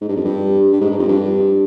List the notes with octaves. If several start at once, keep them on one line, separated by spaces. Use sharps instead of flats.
G#2
G2
F2
G2
G2
G#2
G2
F2
G2